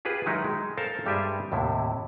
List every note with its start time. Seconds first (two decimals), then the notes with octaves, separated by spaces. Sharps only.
0.05 F4 G4 G#4 B4
0.26 D#3 F#3 G#3 D#4 E4 G4
0.44 G#3
0.77 A4 A#4 C5 F5 A5
1.06 G2 G3 G#3 G4 G#4 E5
1.52 D#2 A2 C3 E4